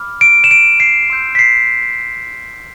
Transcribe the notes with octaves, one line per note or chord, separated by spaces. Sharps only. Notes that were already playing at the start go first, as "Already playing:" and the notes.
Already playing: B5 D6 F6
D7
E7
D7
C7
C6 E6 G6
B6
C7